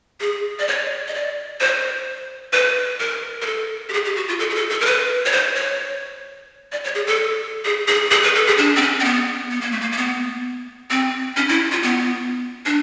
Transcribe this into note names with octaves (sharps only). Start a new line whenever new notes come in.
G#4
D5
C#5
D#5
D5
C5
B4
A#4
A#4
A4
G4
G#4
G4
F#4
F4
A4
G#4
A4
A4
A#4
B4
C#5
C5
C#5
D5
C#5
G#4
A4
G#4
G#4
G#4
B4
A4
G#4
D4
C4
C#4
C4
B3
B3
A#3
A3
A#3
A#3
B3
C4
C#4
E4
F4
B3
D4